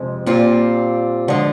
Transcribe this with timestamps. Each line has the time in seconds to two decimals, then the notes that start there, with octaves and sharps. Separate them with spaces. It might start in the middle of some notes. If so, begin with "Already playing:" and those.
Already playing: F2 C3 F3 G#3
0.26 A#2 G3 C4 F4
1.28 D3 F3 G#3